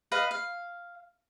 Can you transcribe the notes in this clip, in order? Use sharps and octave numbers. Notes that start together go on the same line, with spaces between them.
B4 D#5 F5
F5